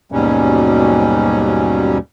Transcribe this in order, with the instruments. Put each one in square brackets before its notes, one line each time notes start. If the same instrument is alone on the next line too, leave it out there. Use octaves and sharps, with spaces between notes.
[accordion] D#2 G#2 B2 F#3 G3 C#4